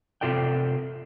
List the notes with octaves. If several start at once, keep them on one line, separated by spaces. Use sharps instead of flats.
C3 F4 A4 D5 G5